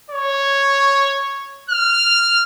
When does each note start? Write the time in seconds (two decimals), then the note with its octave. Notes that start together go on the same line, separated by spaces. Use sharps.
0.10 C#5
1.70 F6